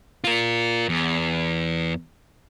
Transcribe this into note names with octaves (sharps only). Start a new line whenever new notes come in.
F4 A#4
E2